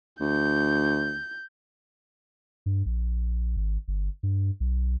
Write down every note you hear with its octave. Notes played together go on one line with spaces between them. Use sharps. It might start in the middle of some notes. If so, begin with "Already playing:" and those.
D2 G6
G2
A#1
G#1
G1
G2
B1